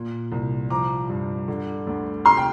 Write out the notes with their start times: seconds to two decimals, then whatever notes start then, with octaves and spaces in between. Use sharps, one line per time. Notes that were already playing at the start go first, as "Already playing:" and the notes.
Already playing: A#2
0.32 C2
0.70 F3 A#5 D6
1.09 G2
1.48 D3
1.87 D2
2.25 C3 C6 F6
2.37 G5